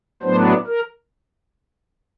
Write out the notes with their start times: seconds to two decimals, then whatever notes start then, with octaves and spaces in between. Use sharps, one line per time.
0.22 A2 F#3 B3 D4 C5
0.67 A#4